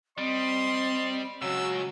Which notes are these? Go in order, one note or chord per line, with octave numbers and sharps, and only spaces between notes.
G3 C4 D#5 C6
C#2 C#3 F#3 F#4 E6